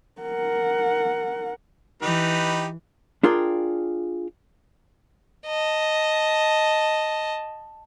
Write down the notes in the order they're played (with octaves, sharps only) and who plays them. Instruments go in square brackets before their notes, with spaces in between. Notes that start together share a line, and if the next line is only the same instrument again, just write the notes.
[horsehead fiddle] A#4 F#5
[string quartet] E3 [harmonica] D#4 G4 B4
[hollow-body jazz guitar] D4 F4 G#4 A#4 G5
[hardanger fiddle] D#5 A5